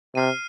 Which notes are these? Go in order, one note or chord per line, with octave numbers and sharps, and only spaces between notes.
C3 F6 C7 D#7